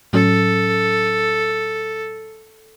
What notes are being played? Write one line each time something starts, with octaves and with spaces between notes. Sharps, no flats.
A2 F#3 C#4 A4